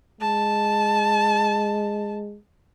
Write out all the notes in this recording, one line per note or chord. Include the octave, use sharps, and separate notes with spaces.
G#3 A5